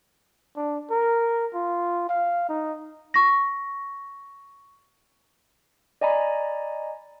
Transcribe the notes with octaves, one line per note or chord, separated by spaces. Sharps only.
D4
A#4
F4
F5
D#4
C#6 A#6
D5 D#5 G#5 A#5 B5